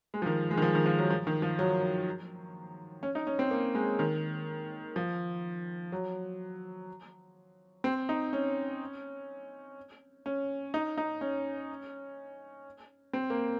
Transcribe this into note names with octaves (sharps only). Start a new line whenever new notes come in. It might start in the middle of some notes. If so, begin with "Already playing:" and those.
G#3
F3
D#3
G#3
D#3
F3
D#3
F3
F#3
F3
D#3
F3
F#3
C#4
D#4
C#4
C4
A#3
G#3
D#3
F3
F#3
C4
D#4
C#4
C#4
D#4
D#4
C#4
C4
A#3